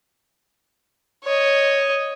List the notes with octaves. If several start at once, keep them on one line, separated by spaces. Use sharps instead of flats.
C#5 D#5